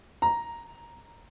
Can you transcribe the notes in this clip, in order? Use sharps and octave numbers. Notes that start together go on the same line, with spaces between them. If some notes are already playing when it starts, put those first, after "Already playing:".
A#5